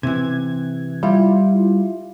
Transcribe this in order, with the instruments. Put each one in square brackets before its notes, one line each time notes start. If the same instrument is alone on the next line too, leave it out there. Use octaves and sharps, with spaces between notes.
[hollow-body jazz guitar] C3 E3 [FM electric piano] G#6
[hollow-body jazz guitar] G3 [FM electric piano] E4 F4